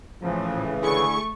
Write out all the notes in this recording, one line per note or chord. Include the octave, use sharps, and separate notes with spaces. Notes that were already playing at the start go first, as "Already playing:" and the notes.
A2 C#3 E3 F3
D3 A3 E4 G#4 C#6